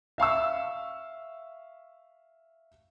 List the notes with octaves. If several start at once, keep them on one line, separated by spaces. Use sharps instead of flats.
E5 F5 C#6 E6